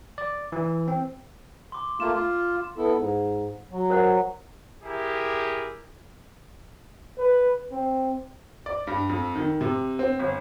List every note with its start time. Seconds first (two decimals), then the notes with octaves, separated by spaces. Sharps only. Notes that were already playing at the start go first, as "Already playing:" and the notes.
0.18 D5
0.52 E3
0.88 C4
1.72 C6 D6
2.00 A3 A#3 F4 E7
2.15 F4
2.77 B3 E4 A4
2.94 G#2
3.71 F#3
3.90 A#4 C5 F#5
4.82 E4 G4 G#4 A#4
7.18 B4
7.71 C4
8.66 D5
8.87 G2
9.09 F2
9.35 D#3
9.61 C3
9.99 C4
10.19 G1